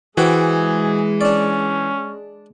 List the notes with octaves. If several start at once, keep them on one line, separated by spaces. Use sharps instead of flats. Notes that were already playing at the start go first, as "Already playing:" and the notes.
E3 G#3 F#4 G#4 C5 G5
C#4 D4 D5